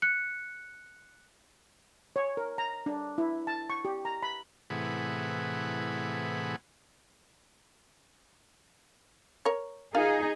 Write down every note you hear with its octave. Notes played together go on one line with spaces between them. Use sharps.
F#6 C#7
C#5
A#4
A#5
D4
E4
A5
C#6
G4
A#5
B5
A2 C3 E3 G#4 B4 F#5
A#4 C#5
D#4 F4 G#4 A#4 F5